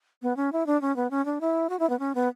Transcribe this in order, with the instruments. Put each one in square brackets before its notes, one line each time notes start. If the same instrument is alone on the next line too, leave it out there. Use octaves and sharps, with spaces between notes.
[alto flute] B3
C#4
E4
D4
C#4
B3
C#4
D4
E4
F#4
E4
B3
C#4
B3